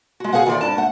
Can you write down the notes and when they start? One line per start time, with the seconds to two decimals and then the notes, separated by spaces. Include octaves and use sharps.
0.20 G#3 F#4
0.33 F#4 G#4 C5 F5 F#5
0.46 D#3 E3 F4 C#5 D5
0.61 G2 D4 A5
0.77 A3 F#5